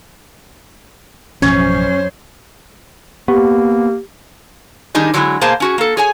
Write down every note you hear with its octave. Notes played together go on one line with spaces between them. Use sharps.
A1 F#2 B2 F3 C#4 C5 C#5
A#3 B3 G4
D#3 G3 D4 D#4 G#4
D3 F#3 G#3 C#4 E4
B2 A#3 G#4 C5 F5 A5
C#4 F#4 G#4
A#3 A4
G#4 C#5 G#5